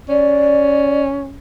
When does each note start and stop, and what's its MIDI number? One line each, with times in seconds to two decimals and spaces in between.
0.09 1.36 61
0.09 1.02 74